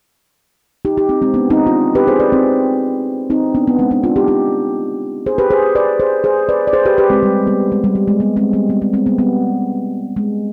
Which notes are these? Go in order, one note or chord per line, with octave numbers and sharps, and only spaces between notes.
D#4 G4
D#4 G4
C4 D#4
G#3 C4
B3 D4
C4 D#4
D4 F4
G4 B4
G#4 C5
B4 D5
C4 D#4
C4 D#4
B3 D4
B3
G#3 C4
B3 D4
D4 F4
D#4 G4
D#4 G4
G#4 C5
G4 B4
G#4 C5
B4 D5
G#4 C5
G#4 C5
B4 D5
D5
G#4 C5
G4 B4
G4 B4
G#3 C4
G3
G3 B3
G#3
G3
G3
G#3
G3 B3
G#3 C4
G3 B3
G3 B3
G#3 C4
G#3 C4
G3 B3
G3 B3
G#3